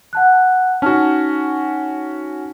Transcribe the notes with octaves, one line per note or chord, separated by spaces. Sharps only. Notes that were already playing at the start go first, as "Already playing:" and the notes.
F#5 A5 F#6
C#4 D#4 F#4 A5 F6